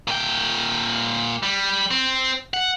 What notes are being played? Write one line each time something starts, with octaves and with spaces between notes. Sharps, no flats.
A#2 G5
G3
C4
F#5